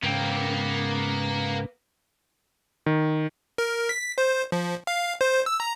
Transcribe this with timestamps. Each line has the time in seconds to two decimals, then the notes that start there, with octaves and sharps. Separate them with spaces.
0.03 G#2 C#3 A#3 B3 G5
2.86 D#3
3.58 A#4
3.89 B6
4.18 C5
4.52 F3
4.87 F5
5.21 C5
5.46 E6
5.60 A#5